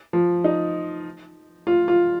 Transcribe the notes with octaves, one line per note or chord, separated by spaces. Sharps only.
F3
D#4
F4
F4